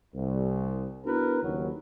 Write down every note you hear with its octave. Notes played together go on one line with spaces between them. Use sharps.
C2
B3 D4 E4 F#4 A#4 B4
F#1 D#2 F#3